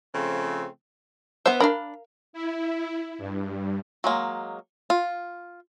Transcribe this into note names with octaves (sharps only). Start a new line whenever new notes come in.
C#3 F3 A3 C4
B3 C5 E5
D4 A#4 F5 B5
E4
G2
F#3 G#3 A#3
F4